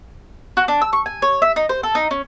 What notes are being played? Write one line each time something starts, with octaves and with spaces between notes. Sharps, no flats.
F#4
D4
E6
C#6
G#5
C#5
E5
D#4
C5
A4
D#4
C#4